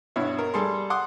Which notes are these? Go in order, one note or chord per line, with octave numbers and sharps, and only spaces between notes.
G2 B2 E4 C#5
A#4
G3 G#4 A4 C6
F#5 C6 D6 D#6